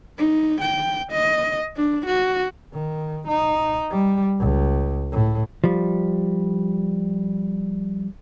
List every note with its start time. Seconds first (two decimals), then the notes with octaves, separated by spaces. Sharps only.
0.18 D#4
0.61 G5
1.12 D#5
1.77 D4
2.06 F#4
2.73 D#3
3.28 D#4
3.90 G3
4.39 C#2
5.12 A2
5.64 F3 G3